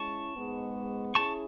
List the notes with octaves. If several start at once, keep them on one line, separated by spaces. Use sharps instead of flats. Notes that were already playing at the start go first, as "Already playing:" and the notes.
Already playing: G#3 C#4 E4 A5 C#6
G#2 G#3 B3
C#4 E4 G#4 A5 C#6